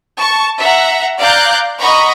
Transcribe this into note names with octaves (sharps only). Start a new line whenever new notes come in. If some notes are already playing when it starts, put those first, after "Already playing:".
A5 C#6
E5 F#5 A#5
D5 F5 A#5 F#6 G6
D#5 F#5 A#5 B5 C#6